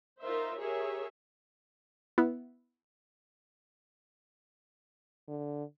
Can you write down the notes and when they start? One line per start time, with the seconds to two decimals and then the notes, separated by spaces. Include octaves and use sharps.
0.22 D#4 F4 A#4 C5 E5
0.58 G4 G#4 A#4 C#5 E5
2.18 B3 E4
5.28 D3